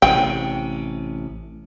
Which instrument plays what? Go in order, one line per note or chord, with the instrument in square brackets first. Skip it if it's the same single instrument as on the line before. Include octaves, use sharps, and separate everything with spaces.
[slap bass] A1 C3 [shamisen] G5